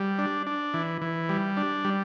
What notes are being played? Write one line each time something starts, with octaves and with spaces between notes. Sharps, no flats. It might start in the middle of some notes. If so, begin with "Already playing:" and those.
Already playing: G3
D4
D4
E3
E3
G3
D4
G3